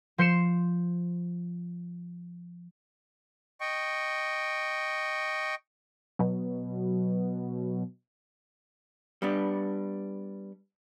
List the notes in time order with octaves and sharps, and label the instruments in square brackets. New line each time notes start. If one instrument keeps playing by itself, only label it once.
[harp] F3 C5 C7 C#7 E7
[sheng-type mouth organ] D#5 G5 C#6
[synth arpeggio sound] B2 F#3
[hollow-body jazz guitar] G3 B3 D4